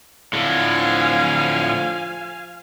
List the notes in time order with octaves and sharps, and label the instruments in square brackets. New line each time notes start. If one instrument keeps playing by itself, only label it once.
[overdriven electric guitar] A2 D3 [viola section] F3 F5 G#5